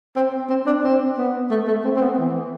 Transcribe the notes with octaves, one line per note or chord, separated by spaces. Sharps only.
C4
C4
D4
C4
B3
A3
A3
C4
C4
B3
E3